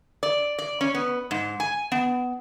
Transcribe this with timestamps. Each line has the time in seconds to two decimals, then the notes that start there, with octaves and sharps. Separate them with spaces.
0.23 D5
0.59 D5
0.81 C#4
0.95 B3
1.31 G#2
1.60 G#5
1.92 B3